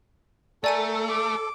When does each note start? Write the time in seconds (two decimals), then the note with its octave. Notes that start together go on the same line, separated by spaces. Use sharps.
0.64 A3 A4 A#4 D5 G#5 D#7
1.08 D6